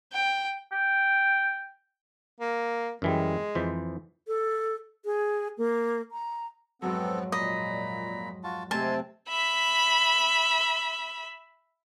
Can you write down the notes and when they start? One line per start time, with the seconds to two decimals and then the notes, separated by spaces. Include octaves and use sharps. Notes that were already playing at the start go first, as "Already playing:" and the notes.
0.13 G5
0.72 G5
2.41 A#3
3.02 F#2 E3 G3 G#3
3.55 F2 E3 C5
4.28 A4
5.05 G#4
5.58 A#3
6.12 A#5
6.82 F2 G#2 F#3 B3 C4 A4
7.32 A#2 D#5 A#5 B5
8.44 F4 F#4 A5
8.71 C3 G#3 A3 C4 G#5 A5 C6
9.29 E5 B5